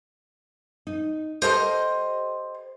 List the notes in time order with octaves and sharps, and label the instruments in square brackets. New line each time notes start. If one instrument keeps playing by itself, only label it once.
[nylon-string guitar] D#4
[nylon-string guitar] G4 A4 [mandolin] C5 D#5 F6